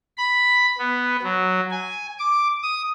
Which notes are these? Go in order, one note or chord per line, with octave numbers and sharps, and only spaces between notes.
B5
B3
F#3
G#5
D6
D#6